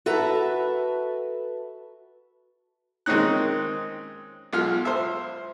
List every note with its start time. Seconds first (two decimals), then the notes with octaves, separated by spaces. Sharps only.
0.06 F#4 A4 B4 E5 A#5
3.06 D#3 G#3 C4 C#4 D#4 F#6
4.53 B1 G#3 F4 F6
4.85 C5 E5